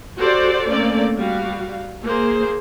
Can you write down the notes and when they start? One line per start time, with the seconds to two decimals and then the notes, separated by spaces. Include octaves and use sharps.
0.18 F#4 G4 A4 C5 D5
0.70 A3 A#3 C4 C#4 D5
1.17 G3 F#4 F5
2.03 A#3 G#4 C5